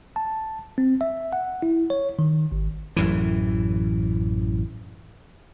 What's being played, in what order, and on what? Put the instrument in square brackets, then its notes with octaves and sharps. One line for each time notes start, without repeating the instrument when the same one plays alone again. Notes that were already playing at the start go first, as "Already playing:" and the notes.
[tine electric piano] A5
C4
E5
F#5
E4
C#5
D#3
G#1
[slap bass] A1 F#2 E3